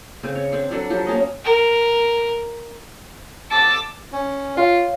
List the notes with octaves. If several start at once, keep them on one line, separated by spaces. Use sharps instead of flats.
C#3 C4
C#5
C4 D4
F#3 D4 A4 B4
F3 F#3 G4
A#3 C#4 D#5
A#4
A5 D6 E6
C#4
F4 C#5 F5